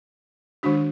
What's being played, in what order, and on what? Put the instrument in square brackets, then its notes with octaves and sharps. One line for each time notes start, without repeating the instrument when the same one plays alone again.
[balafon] D#3 G#3 D4 F#4